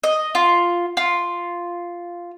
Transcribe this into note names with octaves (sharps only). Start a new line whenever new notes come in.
D#5
F4
F4